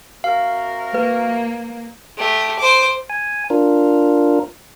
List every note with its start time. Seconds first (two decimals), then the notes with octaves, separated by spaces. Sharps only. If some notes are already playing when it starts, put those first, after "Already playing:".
0.24 C3 F#4 A#4 F5
0.94 A#3 B4
2.18 A3 G4
2.59 C5 D6
3.10 G#5
3.50 D4 F4 A#4